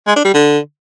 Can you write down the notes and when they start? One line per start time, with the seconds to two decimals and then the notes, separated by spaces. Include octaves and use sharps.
0.08 G#3
0.16 D4
0.25 G3
0.34 D3